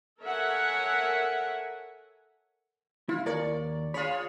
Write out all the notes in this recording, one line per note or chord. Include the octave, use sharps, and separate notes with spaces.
A4 A#4 C#5 E5 F#5 G#5
E4 F4
D#2 A#4 C#5 D5
F4 G#4 C#5 B5